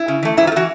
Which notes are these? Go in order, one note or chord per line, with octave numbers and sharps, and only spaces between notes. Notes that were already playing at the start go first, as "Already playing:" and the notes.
Already playing: E4
C#3
E3 A3
G#2 E4
F4
A3
E3 F#4